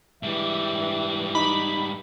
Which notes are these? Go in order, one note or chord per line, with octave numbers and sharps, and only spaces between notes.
G#2 E3 G3 E5
D#4 B5